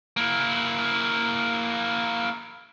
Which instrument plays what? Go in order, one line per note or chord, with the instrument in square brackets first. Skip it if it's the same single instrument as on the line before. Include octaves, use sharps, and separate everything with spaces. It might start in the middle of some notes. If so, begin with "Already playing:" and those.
[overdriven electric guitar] A#3 E4